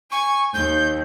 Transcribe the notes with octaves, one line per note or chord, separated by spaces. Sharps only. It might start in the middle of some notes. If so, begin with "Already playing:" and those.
G#5 C#6
D#2 G6